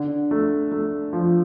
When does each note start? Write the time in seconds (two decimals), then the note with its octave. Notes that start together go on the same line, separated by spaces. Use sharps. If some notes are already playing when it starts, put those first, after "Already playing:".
Already playing: D3
0.31 A3
0.72 A3
1.13 F3